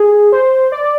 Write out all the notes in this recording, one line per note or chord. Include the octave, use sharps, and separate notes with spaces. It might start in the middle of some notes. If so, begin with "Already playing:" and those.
Already playing: G#4
C5
D5